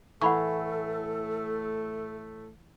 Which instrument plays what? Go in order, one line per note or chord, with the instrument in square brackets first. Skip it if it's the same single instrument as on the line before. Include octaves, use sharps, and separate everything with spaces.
[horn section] A2 A3 [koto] E3 [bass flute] A4 [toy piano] F#5 B5 C#6